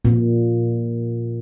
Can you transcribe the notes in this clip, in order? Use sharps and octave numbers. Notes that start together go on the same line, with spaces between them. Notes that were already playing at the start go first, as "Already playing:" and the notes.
A#2